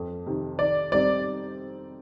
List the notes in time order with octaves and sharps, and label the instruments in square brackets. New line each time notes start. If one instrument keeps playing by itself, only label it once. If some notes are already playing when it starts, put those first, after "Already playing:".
Already playing: [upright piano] F2
C3 D#3
[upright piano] D#3 [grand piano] D5
[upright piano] G3 C4 D#4 [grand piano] D5